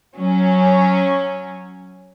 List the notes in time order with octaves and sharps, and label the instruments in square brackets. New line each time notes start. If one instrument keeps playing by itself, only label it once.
[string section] F#3 C#4